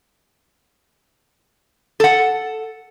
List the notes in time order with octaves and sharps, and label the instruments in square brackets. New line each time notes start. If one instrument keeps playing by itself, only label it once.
[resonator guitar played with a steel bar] A4 F#5